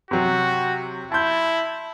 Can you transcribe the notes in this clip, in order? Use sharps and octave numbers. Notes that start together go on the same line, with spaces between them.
C3 F#3 F#4
E4 A5 C6 G6